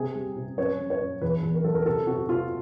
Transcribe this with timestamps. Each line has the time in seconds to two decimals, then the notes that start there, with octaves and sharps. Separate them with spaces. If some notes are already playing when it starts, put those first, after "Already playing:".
Already playing: C3 G#4
0.15 G3
0.36 C3
0.58 F#2 C#5
0.80 F#2
0.90 C#5
1.00 F#2
1.22 E2 B4
1.43 E2
1.54 A#4
1.64 F#3 A4
1.74 A#4
1.86 C3 A4
2.07 C3 F#4
2.28 C3 F4